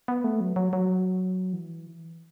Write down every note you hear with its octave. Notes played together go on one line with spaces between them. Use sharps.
B3
A3
F#3
F#3
F#3
E3